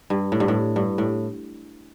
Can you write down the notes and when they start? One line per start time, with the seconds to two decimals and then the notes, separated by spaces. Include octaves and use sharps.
0.10 G2
0.32 A2
0.40 G2
0.48 A2
0.76 G2
0.98 A2